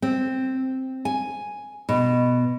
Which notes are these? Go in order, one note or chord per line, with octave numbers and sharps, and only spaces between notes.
C4
G#5
B2